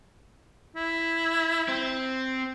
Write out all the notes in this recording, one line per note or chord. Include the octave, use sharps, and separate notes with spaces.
E4
C4